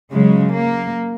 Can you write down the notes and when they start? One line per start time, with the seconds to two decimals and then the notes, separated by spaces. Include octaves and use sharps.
0.12 C#3 F#3 G#3
0.54 A#3